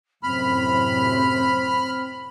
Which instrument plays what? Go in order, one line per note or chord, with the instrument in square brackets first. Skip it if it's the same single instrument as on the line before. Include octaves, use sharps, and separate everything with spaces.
[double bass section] F#2 A2 C3 [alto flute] C4 [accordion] B5 F6